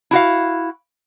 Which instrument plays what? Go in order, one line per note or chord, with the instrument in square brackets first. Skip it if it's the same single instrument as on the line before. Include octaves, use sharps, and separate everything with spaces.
[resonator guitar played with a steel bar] E4 F#4 F5